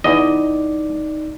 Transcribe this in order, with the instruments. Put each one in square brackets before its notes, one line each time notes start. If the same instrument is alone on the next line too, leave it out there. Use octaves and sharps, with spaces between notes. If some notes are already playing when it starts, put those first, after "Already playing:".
[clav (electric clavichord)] E2 D#5 [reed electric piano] D#4 D5